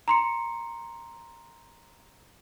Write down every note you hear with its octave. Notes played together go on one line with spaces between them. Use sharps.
A#5 C6 C#7